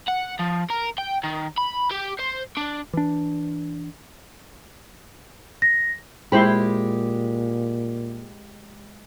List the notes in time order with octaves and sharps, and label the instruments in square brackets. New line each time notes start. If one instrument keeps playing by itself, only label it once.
[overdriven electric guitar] F#5
F3
A#4
G5
D#3
B5
G4
C5
D4
[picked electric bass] E3 D4
[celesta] A#6
[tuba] A#2 [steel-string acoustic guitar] G#3 G4 [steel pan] E4 C5 B5